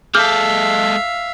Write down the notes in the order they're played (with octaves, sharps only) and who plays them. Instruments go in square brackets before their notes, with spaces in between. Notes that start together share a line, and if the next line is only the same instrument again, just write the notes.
[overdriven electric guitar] G#3 A4 [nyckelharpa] E5 F5 [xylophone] D6 F6 G6